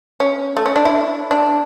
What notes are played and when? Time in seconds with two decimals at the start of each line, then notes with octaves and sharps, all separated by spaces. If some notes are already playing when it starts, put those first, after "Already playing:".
0.20 C#4
0.57 A3
0.66 C#4
0.76 D4
0.85 E4
1.31 D4